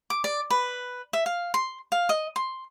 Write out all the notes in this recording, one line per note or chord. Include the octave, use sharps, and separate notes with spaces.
D6
D5
B4
E5
F5
C6
F5
D#5
C6